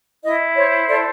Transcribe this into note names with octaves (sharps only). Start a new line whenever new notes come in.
E4 D#5
C5 C#5
A4 D5